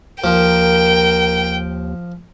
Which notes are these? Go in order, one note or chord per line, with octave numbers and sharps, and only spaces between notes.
D#2 F3 A#4 G5